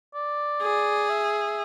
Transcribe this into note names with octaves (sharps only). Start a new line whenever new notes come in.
D5
G#4
E5